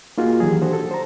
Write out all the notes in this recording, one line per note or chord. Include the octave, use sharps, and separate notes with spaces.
A#3 D#4 F4 F#4 G#4
D#3 E3 F#3 G4 G#4
D4 F#4 G4 A4 C5
A4
C5 A#5